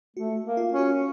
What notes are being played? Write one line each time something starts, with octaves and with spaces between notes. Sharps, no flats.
A3 F#4
A#3
F4
C#4
F#4